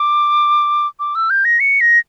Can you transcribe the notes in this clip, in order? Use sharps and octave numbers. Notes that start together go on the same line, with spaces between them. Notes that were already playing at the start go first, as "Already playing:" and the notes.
Already playing: D6
D6
E6
G6
A#6
C#7
A#6